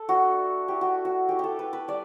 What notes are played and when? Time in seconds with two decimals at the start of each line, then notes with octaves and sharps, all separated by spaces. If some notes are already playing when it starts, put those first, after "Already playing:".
Already playing: A4
0.08 A3 D4 F#4
0.68 A3 E4 G4
0.81 F#4
1.05 F#4
1.28 A3 E4 G4
1.39 G4 A4
1.59 B4
1.73 B4
1.88 G3 D5